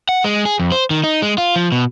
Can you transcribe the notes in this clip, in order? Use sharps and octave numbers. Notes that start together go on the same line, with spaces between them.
F#5
G#3
G#4
F2
C5
D#3
D#4
G#3
F4
F3
B2